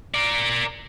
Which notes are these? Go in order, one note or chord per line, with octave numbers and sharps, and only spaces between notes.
A#4 D5